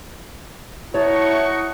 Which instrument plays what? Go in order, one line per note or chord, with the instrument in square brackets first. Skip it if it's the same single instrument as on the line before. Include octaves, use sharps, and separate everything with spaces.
[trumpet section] D#4 F#4 C#6 [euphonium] E4 [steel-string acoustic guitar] C#5 A5